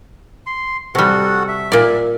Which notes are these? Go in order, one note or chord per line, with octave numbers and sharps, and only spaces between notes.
C6
C3 G3 F#4 A4 F#5
E5
A#2 D5